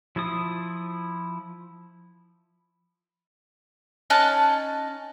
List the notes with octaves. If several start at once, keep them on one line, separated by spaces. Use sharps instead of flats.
F3 E4 F4 D#6
C#4 D#4 A5 F#6